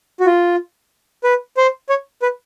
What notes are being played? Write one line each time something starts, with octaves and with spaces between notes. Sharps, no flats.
F#4
F4
B4
C5
C#5
B4